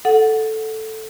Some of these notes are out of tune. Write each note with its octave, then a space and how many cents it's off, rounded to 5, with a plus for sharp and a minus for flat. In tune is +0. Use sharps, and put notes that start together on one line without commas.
A4 +0 F#5 +0